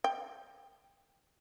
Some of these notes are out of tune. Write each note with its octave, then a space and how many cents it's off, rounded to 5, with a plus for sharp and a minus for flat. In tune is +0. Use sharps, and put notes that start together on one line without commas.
G5 +25